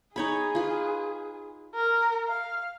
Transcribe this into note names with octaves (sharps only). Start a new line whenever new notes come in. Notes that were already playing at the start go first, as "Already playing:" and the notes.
D#4 G#4 C#5 B5
F4 B4
A#4
F5